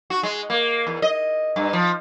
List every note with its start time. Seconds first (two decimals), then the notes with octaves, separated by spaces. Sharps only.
0.10 F#4
0.23 G#3
0.50 A#3
0.87 E2
1.02 D#5
1.56 G2
1.73 F3